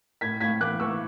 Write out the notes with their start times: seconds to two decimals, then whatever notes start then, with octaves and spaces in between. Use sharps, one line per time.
0.21 A2 G#6 B6
0.40 A2 G#6 B6
0.61 E3 D6 F#6
0.80 E3 C#6 E6